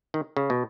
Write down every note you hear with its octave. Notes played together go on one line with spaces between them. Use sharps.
D#3
C#3
B2